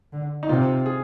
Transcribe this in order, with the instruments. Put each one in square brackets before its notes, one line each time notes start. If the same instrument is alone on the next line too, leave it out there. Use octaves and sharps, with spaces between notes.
[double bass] D3
[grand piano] D#4
[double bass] C3 [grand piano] F4
[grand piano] G#4